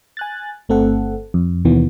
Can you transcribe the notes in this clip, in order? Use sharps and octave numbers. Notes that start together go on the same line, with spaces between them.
G#5 F#6 A6
G1 A3 C4 A4 F#5
F2
D#2 B2 D#3 E3 B3